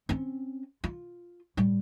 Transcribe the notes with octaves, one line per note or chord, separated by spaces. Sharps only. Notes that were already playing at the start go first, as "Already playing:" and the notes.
C4 C#4
F4
A2 G3